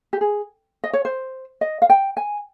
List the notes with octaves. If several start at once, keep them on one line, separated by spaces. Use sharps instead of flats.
G4
G#4
D#5
C#5
C5
D#5
F5
G5
G#5